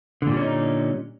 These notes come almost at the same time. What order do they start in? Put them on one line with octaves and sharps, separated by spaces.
D3 A#2 G3 C#4 D#4